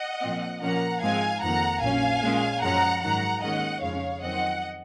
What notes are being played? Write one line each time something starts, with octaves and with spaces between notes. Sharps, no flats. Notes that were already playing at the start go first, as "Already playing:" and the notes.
Already playing: D#5 F#5
A#2 F3 C4
A#2 F3 A#3 C#4 F#5 A#5
G#2 F3 G#3 C4 F5 G#5
F2 D#3 A#3 F#5 A#5
A#1 A#2 F#3 C#4 F5 G#5
A#2 G#3 C#4
F#2 F3 G#3 C#4 F#5 A#5
G#2 D#3 F#3 F#5 A#5
D#2 D#3 G#3 C#4 D#5 F#5
F2 C#3 G#3 C#5 F5
F2 D#3 F#3 C4 D#5 F#5